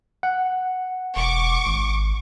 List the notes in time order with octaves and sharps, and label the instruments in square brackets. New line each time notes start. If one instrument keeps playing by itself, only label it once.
[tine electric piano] F#5
[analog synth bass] E1 [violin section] C#6 D6
[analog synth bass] G#1